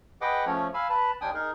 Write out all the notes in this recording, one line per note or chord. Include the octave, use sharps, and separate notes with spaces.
G#4 B4 D#5 F#5 G5 D6
F3 A3 C#4 C#5
F5 G#5 B5 E6
B4 A5 B5
D#2 D4 G5 G#5 D#6
D#4 G#4 A#4